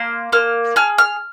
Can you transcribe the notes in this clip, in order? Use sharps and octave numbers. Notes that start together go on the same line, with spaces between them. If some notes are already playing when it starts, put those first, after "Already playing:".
Already playing: A#3 C6
A#3 F6
G#4 F6
F6